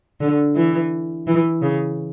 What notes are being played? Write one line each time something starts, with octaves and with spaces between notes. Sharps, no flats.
D3
E3
E3
C#3